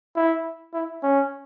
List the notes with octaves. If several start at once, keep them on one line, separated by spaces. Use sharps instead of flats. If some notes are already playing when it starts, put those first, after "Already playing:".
E4
E4
C#4